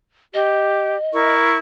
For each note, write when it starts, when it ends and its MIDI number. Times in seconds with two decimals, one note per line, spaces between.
0.34 0.96 67
0.34 1.34 75
1.13 1.57 64
1.13 1.57 70
1.13 1.57 85